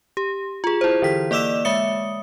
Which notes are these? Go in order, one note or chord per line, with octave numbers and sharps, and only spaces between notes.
G4
F4 G#4
E4 C5
D3 E3 B6
A#3 D5 D6 E6 E7
G#3 E5 D#6 C#7